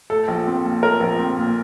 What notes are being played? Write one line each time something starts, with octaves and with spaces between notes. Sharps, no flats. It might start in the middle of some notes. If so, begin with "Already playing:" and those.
A3 A4
A#1
C4
A#2
A3 A#4
A#1
C4
A#2